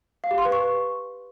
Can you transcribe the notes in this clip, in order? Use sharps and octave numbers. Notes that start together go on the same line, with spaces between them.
F5
G4
C6
B4
C#6